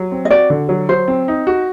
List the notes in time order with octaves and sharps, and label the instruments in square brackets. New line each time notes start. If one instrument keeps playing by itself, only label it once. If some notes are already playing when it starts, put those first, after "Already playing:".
Already playing: [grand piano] F#3
C4
[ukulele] D#5
[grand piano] F#4 [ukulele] D5
[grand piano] D3
F#3
[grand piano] F#3 [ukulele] C5
[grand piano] C4
D#4
F#4